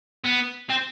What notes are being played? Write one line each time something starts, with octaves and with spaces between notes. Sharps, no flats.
B3
C4